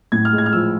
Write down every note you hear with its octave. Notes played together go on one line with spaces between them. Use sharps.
A2 G#6
F6
G#3
G#6
F6
F3 E6